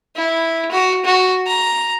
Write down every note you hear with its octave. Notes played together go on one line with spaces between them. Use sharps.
E4
F#4
F#4
A#5